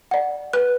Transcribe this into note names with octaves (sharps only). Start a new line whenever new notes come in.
D5 F#5
B4 F#6